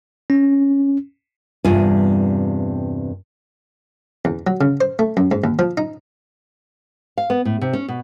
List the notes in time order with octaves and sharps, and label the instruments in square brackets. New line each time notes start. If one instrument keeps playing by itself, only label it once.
[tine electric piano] C#4
[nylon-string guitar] E2 G2 C3 G3 F4 G#5
[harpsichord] E2
F#3
C#3
C5
A3
F#2
G#2
D#2
F3
D#4
[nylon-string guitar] F5
B3
A2
C3
C#4
B2